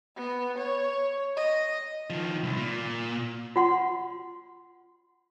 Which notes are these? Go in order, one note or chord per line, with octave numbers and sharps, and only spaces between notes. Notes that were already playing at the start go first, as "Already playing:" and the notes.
B3
C#5
D#5
D#3 F3
C2
A#2
F4 F#5 C6